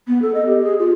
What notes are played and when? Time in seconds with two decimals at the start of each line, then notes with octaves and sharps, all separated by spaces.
0.07 B3
0.22 A4
0.35 D#5
0.46 G4
0.64 G#4
0.79 F4